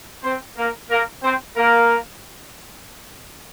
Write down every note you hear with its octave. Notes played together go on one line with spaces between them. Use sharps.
C4 C5
A#3 A#4
A#3 A#4
C4 C5
A#3 A#4